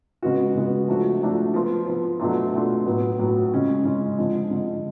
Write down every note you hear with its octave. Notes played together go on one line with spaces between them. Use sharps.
C#3 G#3 B3 F#4
C#3 G#3 B3 F#4
F3 A3 D4 F#4
F3 A3 D4 F#4
F3 B3 F4
F3 B3 F4
B2 F#3 A3 D4 F4
B2 F#3 A3 D4 F4
A2 F#3 B3 F#4
A2 F#3 B3 F#4
C#3 G#3 C#4 F4
C#3 G#3 C#4 F4
D3 F3 G#3
D3 F3 G#3